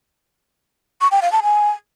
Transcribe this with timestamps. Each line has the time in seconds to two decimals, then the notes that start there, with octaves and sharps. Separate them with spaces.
1.01 C#6
1.11 G5
1.22 F5
1.32 A5
1.43 G#5